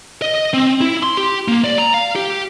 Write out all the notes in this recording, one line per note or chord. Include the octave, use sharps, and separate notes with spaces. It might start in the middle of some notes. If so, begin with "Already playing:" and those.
D#5
C4
E4
C6
G4
A#3
D5
A#5
F5
G4